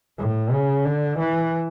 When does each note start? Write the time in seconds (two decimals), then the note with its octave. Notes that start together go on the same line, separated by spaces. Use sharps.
0.18 A2
0.52 C#3
0.85 D3
1.19 E3